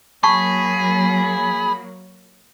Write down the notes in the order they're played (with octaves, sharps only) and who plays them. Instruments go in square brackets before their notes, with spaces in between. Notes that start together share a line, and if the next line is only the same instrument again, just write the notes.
[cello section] F#3 A#3 [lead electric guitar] G#4 [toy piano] A5 C#6 [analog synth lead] B5